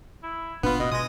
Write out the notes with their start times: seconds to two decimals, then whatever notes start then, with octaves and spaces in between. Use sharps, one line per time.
0.23 E4
0.63 G1 A#2 B3 D4 F4 B4
0.80 B2 D#5
0.92 B2 G#3 D#6 A#6